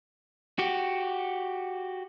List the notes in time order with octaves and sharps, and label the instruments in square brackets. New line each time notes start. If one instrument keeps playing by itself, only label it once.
[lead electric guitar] F#4 G4